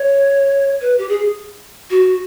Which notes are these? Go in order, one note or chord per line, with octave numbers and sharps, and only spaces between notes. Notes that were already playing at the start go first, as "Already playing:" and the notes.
Already playing: C#5
B4
G4
G#4
F#4